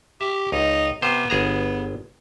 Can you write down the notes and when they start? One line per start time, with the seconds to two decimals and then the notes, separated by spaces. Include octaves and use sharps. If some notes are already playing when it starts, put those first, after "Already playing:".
0.21 G4 E5
0.52 C#2 D#4
1.02 C3 B3 C5
1.30 G1 B3 G#4 A#5